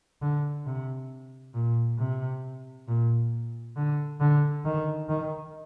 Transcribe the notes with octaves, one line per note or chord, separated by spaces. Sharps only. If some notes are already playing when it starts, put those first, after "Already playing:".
D3
C3
A#2
C3
A#2
D3
D3
D#3
D#3